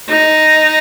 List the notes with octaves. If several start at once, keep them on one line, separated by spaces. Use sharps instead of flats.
D#4